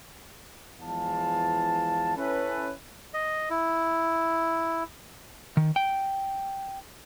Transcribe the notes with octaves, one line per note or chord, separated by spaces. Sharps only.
E2 E3 F3 G#3 F5 A5
C#4 E4 A4 B4
D#5
E4
D#3
G5